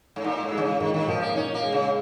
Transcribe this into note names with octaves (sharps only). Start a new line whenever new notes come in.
G#2
A#2 D#4
G#2
G#3
D#3
C#3
A#2 D#3
D#3
A#2 F3
A#3
C#4 D#4
A#3
G#3
C#3